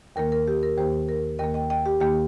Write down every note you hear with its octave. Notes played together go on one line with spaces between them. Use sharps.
D#2 D#3 A#3 A#4
A#4
G4
A#4
D#2 D#3 A#3 G4 C5
A#4
D#2 D#3 A#3 A#4 D#5
D#5 G5
D#5 G5
G4
D#2 D#3 A#3 G4